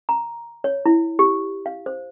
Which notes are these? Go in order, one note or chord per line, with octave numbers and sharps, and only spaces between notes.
A#5
C#5
E4
G4
F5
C5